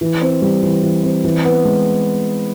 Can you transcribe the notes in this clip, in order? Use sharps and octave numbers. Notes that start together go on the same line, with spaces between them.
E3
C4
G3
E3
E3
C4
E3
B3
G#3